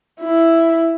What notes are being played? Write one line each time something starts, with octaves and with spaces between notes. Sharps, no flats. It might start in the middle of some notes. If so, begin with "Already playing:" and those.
E4